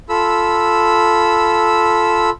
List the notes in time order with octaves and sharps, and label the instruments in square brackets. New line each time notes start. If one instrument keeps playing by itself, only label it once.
[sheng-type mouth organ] F4 A4 B5 E6